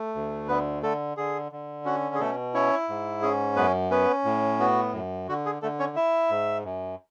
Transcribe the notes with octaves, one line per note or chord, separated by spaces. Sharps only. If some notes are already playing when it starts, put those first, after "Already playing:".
Already playing: A3
D2
D3 B3 B4
D3 A3 A4
D3 G#4
D3
C#4 F#4
G#4
B2 A3 A4
C#4 E4 C#5
G#2
C#4 G#4
F#2 B3 B4
B3 C#4 B4
A2
B3 F#4
F#2
D3 F#4
G#4
D3 A3 A4
C#4 C#5
E4 E5
G#2
F#2